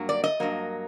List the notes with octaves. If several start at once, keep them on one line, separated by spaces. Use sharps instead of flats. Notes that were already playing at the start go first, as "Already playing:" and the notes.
Already playing: G2 F#3 A#3
D5
D#5
G2 F#3 A#3